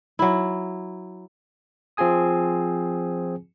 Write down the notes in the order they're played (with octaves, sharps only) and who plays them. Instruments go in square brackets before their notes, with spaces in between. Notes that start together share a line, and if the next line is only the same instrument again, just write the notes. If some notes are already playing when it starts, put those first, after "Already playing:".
[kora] F#3 E4
[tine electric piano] F3 C4 F4 G#4 G#5 D#6